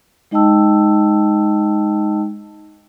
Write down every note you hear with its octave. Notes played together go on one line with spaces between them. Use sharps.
G#3 D#4 D#5 G5 A5 E6